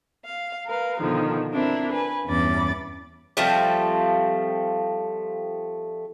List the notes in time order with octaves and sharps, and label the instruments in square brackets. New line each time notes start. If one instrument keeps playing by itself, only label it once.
[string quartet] F5
A#4 B4 F5
B2 D3 D#3 F3
C4 D4 E4 A#4
B4 G#5
E2 G2 C#4 B5 D6 A6
[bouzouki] F3 G3 A3 C4